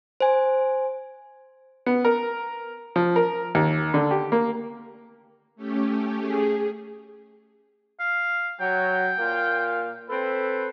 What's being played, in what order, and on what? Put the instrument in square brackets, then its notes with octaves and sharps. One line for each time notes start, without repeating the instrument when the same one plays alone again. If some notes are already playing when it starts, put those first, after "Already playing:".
[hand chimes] C5 G#5
[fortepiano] B3
A#4
F3
A#4
D#2
D3
G4
A#3
[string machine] A3 C#4 G4
[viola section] G#4
[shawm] F5
[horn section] F#3 [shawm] G5
[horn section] A#2 A#3 F5
C4 A4 B4